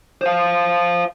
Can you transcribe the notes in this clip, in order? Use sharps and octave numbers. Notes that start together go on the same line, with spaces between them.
C5 F5